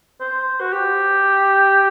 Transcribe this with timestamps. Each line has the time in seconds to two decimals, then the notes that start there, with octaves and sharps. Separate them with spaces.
0.21 C5
0.60 F#4
0.72 G4